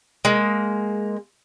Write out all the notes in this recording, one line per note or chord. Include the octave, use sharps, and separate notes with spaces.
G#3 A#3